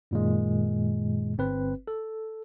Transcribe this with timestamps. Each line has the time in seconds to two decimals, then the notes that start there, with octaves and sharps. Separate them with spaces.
0.11 F#2 A#2 D#3 G#3
1.38 G1 C4 B4
1.88 A4